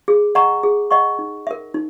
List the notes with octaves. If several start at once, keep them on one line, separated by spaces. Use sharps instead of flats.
G#4
D#5 F#5 A#5 C#6
G#4
D#5 F#5 A#5 C#6
D#4
A#4 E5
D#4